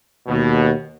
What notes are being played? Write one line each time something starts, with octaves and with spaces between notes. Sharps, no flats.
D#2 B2